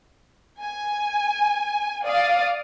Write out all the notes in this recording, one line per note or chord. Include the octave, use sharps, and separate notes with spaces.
G#5
D5 F5 D#6